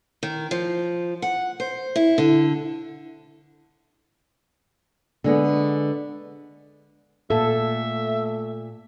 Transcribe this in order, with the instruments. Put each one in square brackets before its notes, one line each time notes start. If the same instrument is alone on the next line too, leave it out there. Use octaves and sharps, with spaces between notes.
[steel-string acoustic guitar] D#3
F3
F#5
C5
E4
D3
[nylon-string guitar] D3 G#3 B3
[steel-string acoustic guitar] A#2 [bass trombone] A3 [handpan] A4 [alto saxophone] E5